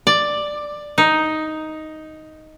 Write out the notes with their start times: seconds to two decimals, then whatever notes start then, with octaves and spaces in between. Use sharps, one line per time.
0.07 D5
0.98 D#4